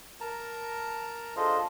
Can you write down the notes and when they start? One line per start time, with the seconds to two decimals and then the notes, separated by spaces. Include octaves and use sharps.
0.20 A#4 A5 A#5
1.36 D4 F4 G#4 A4 C5 D#5